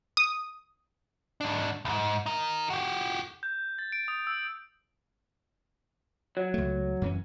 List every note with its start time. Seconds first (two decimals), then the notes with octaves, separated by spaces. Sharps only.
0.17 D#6
1.41 G#2 D4
1.85 C2 G#2
2.26 D#4 A#4
2.70 F#4 G4
3.43 G6
3.79 A6
3.92 D7
4.08 D#6
4.27 E6
6.37 F#3
6.54 C#2 A3
7.02 F#2 E3 C#4